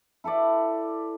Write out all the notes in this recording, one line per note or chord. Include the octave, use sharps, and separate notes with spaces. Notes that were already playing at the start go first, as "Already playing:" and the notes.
E4 A4 B4 D5